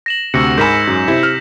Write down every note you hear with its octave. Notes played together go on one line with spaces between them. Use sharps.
A#6 E7 F#7
D2 C3 F#4 E6 A#6 C#7
G#2 A#4 G#5 B5 G6 B6 E7
F#2
C3 E4
F6